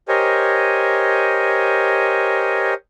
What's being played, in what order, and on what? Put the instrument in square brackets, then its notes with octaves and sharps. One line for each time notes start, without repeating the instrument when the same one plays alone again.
[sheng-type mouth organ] G4 A#4 C5 C#5 D#5 G#5